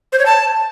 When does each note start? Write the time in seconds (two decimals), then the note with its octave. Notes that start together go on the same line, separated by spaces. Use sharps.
0.12 C5
0.19 C#5
0.26 A5